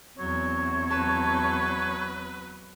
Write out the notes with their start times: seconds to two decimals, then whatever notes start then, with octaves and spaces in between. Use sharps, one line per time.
0.19 E2 F#3 C4 C#5
0.91 F#3 B4 A5